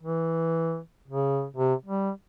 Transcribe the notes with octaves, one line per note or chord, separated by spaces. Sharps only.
E3
C#3
C3
G3